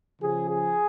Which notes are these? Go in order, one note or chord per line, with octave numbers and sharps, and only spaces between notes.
C#3 F3 G#4
G#4